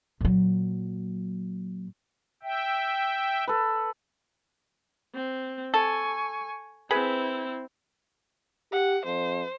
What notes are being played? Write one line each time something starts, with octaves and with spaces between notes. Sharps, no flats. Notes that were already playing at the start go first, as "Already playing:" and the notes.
A#2 F#3
E5 G5
A4 B4
C4
A4 G#5 C#6
C4 E4 G#4 B4 B5
G4 F#5
F2 C5